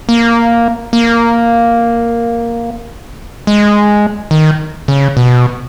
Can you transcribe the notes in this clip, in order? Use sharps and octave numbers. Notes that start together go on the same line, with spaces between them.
A#3
A#3
G#3
D#3
C#3
B2